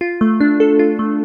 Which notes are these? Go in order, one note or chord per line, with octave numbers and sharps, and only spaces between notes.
F4
A3
D4
A4
F4
A3